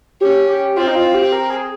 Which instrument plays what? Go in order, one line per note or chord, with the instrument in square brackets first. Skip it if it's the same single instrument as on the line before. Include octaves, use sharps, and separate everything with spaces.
[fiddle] C#4 [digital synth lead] G4
[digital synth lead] G4
[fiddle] C4 [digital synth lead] F4
[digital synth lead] D#4
F4
G4
A#4
G#4